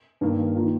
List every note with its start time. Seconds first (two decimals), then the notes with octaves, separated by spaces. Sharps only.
0.21 G2 D#3 A#3
0.55 D#3 A#3 F4